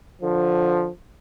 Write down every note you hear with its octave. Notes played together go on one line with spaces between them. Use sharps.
D3 F3